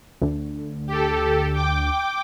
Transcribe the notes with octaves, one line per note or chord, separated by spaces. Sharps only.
D2 D3
G4 A4
G5 D6